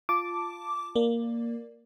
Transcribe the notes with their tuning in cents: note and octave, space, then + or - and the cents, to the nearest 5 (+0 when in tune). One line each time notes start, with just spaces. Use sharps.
F4 +0 A5 +5 D6 -5
A#3 +0 D5 +5